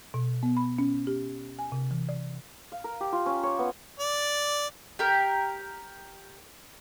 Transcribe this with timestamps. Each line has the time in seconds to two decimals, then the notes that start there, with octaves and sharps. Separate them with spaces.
0.14 B2
0.43 B3
0.57 B5
0.78 C#4
1.07 G4
1.59 G#5
1.72 C3
1.91 E3
2.09 D5
2.72 F5
2.84 A#4
3.01 G4
3.12 F4
3.26 C#4
3.43 C#5
3.59 B3
4.00 D5
4.99 G4 A#4